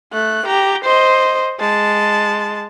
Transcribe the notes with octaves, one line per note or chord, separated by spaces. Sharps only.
A3 F#6
G4 A#5
C5 D#5
G#3 A5